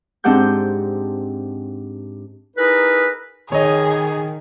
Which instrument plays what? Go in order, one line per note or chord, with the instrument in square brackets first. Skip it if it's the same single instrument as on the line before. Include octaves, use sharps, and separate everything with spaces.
[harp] G#2 C4 D4 G4 F#5 G6
[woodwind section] D#4 E4 G#4 A#4 B4
[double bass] D#3 [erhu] G#4 [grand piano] C#5 D#5